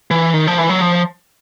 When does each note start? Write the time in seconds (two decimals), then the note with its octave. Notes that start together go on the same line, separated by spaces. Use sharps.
0.11 E3
0.34 D#3
0.47 F3
0.58 E3
0.69 F#3
0.81 F3